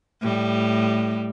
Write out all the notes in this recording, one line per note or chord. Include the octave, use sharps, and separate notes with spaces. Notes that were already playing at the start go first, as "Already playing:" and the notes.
A2 G3